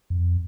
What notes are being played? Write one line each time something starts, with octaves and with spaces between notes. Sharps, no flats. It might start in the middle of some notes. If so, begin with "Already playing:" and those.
F2